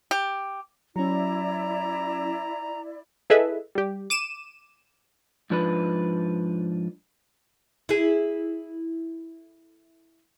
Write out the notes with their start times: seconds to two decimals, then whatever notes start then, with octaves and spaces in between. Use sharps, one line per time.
0.11 G4
0.96 F#3 C#4 E4 D5 A#5
3.30 E4 G#4 A4 B4 D#5 E5
3.75 G3 G4
4.10 D6 D#7 E7
5.50 G#2 F3 D4 B4
7.89 E4 G#4